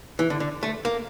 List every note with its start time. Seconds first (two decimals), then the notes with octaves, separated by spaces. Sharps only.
0.19 E3
0.30 D3
0.40 D3
0.63 A3
0.85 A#3